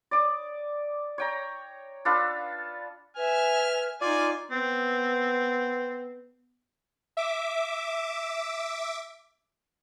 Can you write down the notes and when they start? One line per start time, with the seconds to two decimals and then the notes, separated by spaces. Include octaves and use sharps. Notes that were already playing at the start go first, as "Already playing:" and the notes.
0.11 D5 D6 D#6
1.18 C#5 G5 A#5
2.05 D4 F4 A4 B4
3.17 B4 E5 G#5 F6
4.01 D#4 F4 D5 G#5
4.51 B3 C4
7.17 E5 D6